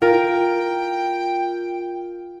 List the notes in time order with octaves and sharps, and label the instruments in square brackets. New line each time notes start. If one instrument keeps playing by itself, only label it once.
[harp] F4 A#4 [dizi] G5